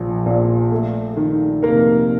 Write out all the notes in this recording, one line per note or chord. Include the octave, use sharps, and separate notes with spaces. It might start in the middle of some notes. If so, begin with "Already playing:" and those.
Already playing: A#1 F3
A#2
A3
D#3
F1 A#3 A#4